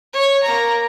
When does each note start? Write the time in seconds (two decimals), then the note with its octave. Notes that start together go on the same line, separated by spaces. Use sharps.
0.13 C#5
0.43 A#3 A#5